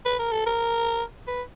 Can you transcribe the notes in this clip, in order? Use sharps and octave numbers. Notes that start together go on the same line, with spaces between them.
B4
A#4
A4
A#4
B4